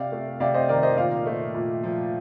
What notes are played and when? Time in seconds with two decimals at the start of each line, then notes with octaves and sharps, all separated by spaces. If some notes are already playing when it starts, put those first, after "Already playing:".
Already playing: C3 D5 F5
0.12 A3
0.40 C3 D5 F5
0.54 C5 D#5
0.69 D#3 A#4 D5
0.83 C5 D#5
0.97 A#2 D5 F5
1.26 A3
1.54 A#2
1.83 F3